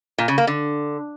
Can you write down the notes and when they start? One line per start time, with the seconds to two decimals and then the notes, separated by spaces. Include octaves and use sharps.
0.18 A#2
0.28 C#3
0.38 A#3
0.47 D3